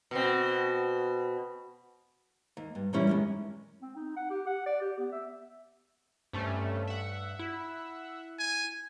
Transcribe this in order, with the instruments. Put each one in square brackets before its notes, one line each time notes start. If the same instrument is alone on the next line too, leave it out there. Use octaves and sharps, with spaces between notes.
[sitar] B2 C4
[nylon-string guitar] D#2
G2
A#2 D3 E3 G3 C#4 E4
F#2 D#3 G#3
[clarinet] C4
D#4
F#5
G4
F#5
D5
G4
B3
E5
[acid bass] G2 [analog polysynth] C3 A3 C#4
[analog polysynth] E5 F#5
[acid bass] E4
[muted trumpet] G#5